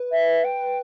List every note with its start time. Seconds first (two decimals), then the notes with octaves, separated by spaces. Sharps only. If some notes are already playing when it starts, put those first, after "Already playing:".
Already playing: B4
0.11 E5
0.44 G5